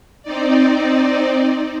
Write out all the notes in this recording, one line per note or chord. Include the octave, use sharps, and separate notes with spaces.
C4 D#4 D5